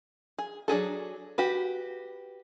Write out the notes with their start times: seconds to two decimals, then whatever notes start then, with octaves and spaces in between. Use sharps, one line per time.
0.38 G#4
0.68 F#3 D4 G#4 A4
1.38 F#4 G4 B4